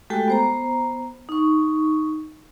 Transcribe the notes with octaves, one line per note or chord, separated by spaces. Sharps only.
G#3 A3 F#4 G4 A4 G5
B3 C5 A#5
D#4 C#6